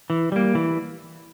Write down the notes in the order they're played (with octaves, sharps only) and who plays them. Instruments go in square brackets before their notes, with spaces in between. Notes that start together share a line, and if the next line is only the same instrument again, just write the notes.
[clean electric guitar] E3
G3 A#3
E3